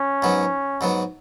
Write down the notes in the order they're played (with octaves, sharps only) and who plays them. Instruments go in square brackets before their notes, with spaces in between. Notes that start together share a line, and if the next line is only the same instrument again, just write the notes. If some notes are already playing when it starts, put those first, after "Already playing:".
Already playing: [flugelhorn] C#4
[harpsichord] G#2 F#3 B3
G#2 F#3 B3